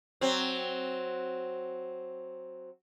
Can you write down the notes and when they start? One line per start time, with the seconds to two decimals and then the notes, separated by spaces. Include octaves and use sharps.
0.21 F#3 C4